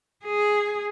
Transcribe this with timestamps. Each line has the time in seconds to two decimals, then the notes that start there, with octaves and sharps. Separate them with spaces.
0.25 G#4